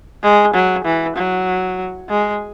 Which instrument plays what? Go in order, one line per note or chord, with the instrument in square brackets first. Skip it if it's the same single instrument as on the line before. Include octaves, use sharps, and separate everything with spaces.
[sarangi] G#3
F#3
E3
F#3
G#3